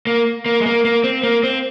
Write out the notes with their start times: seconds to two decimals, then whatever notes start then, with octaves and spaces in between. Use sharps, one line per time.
0.07 A#3
0.46 A#3
0.61 G#3
0.66 A#3
0.85 A#3
1.04 C4
1.23 A#3
1.43 C4